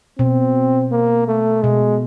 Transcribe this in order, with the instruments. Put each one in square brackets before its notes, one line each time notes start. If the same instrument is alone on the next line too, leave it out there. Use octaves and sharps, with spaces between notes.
[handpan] B2 [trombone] C4
[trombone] A#3
A3
[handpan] B2 [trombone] G#3